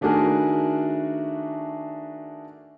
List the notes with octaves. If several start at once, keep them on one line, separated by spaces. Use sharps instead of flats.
D#3 A3 D4 F#4 G#4 A#4